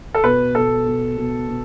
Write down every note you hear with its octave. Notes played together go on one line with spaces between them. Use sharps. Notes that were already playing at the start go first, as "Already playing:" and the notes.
A4
B2 B4
B2 A4
B2
B2
B2